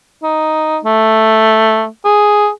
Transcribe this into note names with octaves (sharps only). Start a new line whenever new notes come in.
D#4
A3
G#4